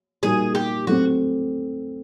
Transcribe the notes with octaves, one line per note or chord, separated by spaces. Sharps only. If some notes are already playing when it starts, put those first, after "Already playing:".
A#2 G3 A#3 D#4 F#4 G#4
G4
F#3 A3 C4 F#4